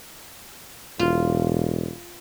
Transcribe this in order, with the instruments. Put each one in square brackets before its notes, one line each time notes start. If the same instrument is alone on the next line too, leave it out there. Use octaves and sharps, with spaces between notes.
[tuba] E1 [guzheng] F4